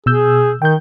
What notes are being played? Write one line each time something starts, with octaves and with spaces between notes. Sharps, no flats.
B2 G#4 E6 G6
D#3 G5 G6